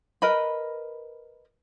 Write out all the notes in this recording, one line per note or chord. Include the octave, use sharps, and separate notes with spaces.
A#4 B4 D#5 B5